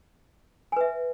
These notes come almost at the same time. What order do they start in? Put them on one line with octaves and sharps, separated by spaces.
G#5 B4 E5